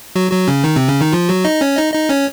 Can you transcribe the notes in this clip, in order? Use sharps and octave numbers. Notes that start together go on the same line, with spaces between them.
F#3 F#4
F#3 F#4
C#3 C#4
D#3 D#4
C3 C4
C#3 C#4
D#3 D#4
F3 F4
F#3 F#4
D#4 D#5
C#4 C#5
D#4 D#5
D#4 D#5
C#4 C#5